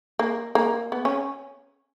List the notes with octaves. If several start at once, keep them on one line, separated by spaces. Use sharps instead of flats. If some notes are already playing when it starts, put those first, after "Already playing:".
A#3
A#3
B3
C#4